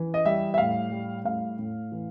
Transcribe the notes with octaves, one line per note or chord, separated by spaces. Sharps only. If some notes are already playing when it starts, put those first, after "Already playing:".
Already playing: E3
D#5
G3 E5
E5
A2 F5
G3
A2 F5
A2
E3